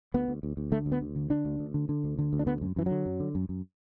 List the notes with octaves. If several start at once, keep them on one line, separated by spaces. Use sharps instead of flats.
D2 B3
D2
D2
D2
D3 A3
D2
B3
D2
D3
D3 D4
D2
D2
D3
D3
D2
D3
D2
D4
D3 B3
F#2
F#2 E3
D3 F#3
F#2
D3
F#2
F#2